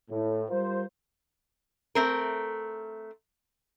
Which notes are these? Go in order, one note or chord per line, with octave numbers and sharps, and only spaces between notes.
A2
G3 F4 A#4 C5
A3 C4 A#4